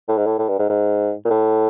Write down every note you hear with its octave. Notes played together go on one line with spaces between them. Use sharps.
A2
G#2
A2
A2
G2
G#2
G#2
A#2
A2